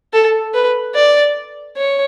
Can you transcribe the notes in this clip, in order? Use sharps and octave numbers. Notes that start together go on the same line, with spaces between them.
A4
B4
D5
C#5